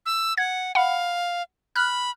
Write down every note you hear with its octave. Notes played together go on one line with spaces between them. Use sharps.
E6
F#5 G#6
F5 F#5 B5
B5 F6 F#6